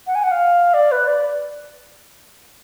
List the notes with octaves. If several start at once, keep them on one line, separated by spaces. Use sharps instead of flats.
F#5
G#5
F#5
F5
D5
B4
D5